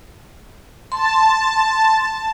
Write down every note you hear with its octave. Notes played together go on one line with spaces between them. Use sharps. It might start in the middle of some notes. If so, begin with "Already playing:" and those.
A5 C6